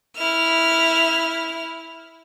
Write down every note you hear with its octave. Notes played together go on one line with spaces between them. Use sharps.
E4 F6